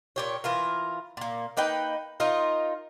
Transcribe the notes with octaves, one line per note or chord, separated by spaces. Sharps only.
A#2 G4 C#5
E3 F4 A#4
A#2 A#3
A#3 D#4 B4 G5
D#4 F4 A#4 D#5